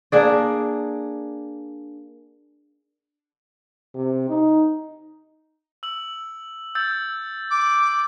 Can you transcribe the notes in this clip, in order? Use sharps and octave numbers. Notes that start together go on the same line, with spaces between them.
A#3 D4 G#4 D5
C3
D#4
E6 F#7
E6 G6 A6
D6